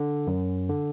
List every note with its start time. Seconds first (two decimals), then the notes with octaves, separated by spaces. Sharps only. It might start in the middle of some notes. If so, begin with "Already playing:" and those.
Already playing: D3
0.27 F#2
0.69 D3